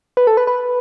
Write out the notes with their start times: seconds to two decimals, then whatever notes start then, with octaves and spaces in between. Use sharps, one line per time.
0.17 B4
0.27 A4
0.37 B4
0.47 B4